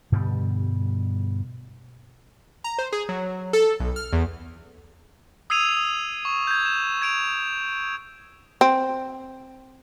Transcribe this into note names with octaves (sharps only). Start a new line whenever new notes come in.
G2 B2 D3 G3
A#5
C5
G#4
F#3
A4
B1
F6
E2
D#6 E6 G#6 C7 D#7 F7
D#6
C#6
G6 G#6
E7
G#6 D7 F7
C4